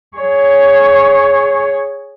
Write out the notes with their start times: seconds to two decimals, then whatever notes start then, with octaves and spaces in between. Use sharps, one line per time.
0.17 G#4 C#5